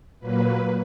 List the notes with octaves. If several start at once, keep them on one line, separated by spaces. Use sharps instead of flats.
A#2 F#3 A#3 B4